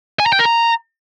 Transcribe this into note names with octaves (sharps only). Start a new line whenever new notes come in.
G#5
A#5
G5
A#4
A#5